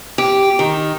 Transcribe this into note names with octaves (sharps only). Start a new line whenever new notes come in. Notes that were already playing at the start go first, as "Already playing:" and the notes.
G4
D#3